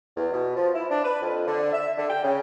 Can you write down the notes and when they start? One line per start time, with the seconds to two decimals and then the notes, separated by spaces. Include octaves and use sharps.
0.16 E2
0.32 B2
0.56 F3
0.74 E4
0.89 D4
1.04 B4
1.21 F2
1.46 D3
1.72 E5
1.97 D3
2.09 G5
2.23 C#3